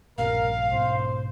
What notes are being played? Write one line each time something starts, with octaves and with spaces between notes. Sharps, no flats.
A#1 G2 C3 A#4 F5
B1 G#2 C5